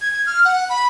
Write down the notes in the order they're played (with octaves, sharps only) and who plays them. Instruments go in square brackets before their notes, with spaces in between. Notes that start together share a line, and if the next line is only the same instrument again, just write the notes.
[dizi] G#6
F6
F#5
B5